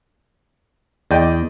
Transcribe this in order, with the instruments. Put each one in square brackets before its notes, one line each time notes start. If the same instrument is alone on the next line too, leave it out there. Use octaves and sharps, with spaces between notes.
[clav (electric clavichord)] E2 [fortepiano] D5 D#5 G5